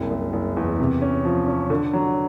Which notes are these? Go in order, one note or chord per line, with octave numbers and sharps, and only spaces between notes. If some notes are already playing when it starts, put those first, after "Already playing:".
Already playing: F#1 C2
F#1
F#1
E2
C3
C#4
F3
C#4
D3
F#3